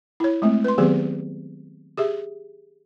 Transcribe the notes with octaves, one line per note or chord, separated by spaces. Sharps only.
E4 C#5
G#3 A3 C4
B4 C6
D#3 F#3 B3 C4 G4 G#4
G4 G#4 E5